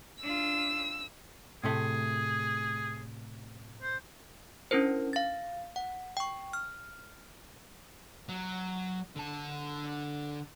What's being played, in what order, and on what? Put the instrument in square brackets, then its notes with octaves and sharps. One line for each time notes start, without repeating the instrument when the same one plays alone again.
[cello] D4 F4 [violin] E6
[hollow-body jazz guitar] A2 C3 A3 [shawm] G#4
[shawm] C5
[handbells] C#4 D4 E4 A#4 C5
F5 A6
F#5
G5 C#6
F6
[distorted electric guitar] F#3
D3 A5